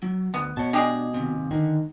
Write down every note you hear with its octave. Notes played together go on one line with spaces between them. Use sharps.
F#3
D2 B3
B2 C#5 A5
G#3 D4 G4 G#4
D#2 C3
D3 D#3